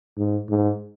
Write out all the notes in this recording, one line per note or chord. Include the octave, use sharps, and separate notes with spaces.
G#2
G#2